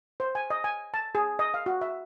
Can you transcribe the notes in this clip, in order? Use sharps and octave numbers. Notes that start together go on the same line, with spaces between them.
C5
G#5
D#5
G#5
A5
G#4
D#5
F5
F#4
E5